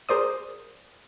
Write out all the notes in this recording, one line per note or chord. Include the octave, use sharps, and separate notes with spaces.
G#4 A#4 C5 D5 D#6